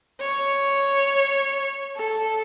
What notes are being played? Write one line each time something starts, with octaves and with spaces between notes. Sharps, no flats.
C#5
A4